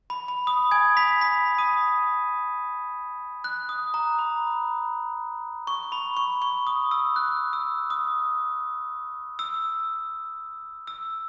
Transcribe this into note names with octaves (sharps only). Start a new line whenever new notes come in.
B5
B5
D#6
G#5 G#6
B5 B6
B5 B6
D#6 D#7
F#6
D#6
A#5
B5
C#6
B5
C#6
C#6
D#6
E6
F#6
E6
D#6
E6
E6